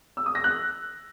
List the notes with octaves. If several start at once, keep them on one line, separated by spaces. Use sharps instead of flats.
E6
D#6
A#6
F#6